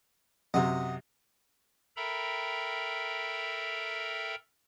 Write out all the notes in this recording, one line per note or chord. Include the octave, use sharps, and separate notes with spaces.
F#2 C3 D#5 F#5
A4 A#4 E5 G5 A#5 B5